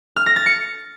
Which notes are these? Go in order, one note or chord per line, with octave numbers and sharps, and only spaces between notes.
F6
A#6
A6
C#7